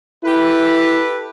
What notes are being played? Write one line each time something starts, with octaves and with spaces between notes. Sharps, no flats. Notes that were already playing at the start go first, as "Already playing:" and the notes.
E4 G4 A4 B4